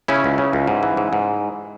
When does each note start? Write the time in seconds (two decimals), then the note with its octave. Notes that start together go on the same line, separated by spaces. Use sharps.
0.08 C#3 C#4 E4
0.24 C#2
0.38 C#3
0.53 C#2
0.67 G#2
0.83 E3
0.97 G#2
1.13 G#2